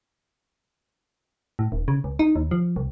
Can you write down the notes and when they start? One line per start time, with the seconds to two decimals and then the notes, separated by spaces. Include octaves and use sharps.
1.59 A2
1.72 D#1
1.88 C#3
2.04 C#2
2.19 D#4
2.36 D#2
2.51 F3
2.76 C2